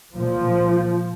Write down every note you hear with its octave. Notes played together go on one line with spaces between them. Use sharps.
A#2 F3